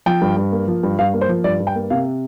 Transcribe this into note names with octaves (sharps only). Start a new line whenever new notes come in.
F3 G5
G2
G2
A#3
F3
G2
G2 F5
A#3
C5
F3
G2 D5
G2
G5
A#3
C3 F5